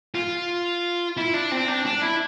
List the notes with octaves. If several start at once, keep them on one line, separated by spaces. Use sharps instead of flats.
F4
E4
D4
C4
D4
D4
E4